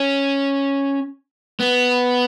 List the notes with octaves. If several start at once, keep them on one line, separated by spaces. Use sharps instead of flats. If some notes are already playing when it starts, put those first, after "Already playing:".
Already playing: C#4
B3